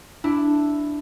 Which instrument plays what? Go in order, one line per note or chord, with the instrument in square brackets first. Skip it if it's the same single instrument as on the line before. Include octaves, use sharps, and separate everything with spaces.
[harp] D4 E4